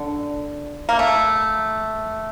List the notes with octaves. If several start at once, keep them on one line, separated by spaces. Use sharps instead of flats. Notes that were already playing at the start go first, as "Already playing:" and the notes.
Already playing: D3
A#3
A3